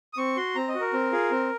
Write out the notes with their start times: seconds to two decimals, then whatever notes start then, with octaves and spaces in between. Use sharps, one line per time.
0.13 D#6
0.18 C4 C#6
0.37 F#4 C6
0.55 C4 A#5
0.68 D#5
0.75 F#4
0.80 A#4
0.93 C4
1.12 F4 G#4
1.31 C4